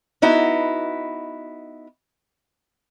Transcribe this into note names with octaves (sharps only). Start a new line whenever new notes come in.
B3 D#4 E4 F#4